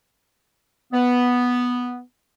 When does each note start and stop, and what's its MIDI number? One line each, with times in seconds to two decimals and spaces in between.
0.92 2.00 59